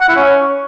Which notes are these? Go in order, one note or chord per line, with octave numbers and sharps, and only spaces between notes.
F#5
E4
C#4